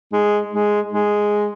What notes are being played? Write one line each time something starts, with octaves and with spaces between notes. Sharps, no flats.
G#3
G#3
G#3